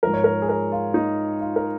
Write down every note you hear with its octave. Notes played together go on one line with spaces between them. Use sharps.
G#2 F3 A#4
C#5
A#4
G#4
A#4
F4
D#4
F4
A#4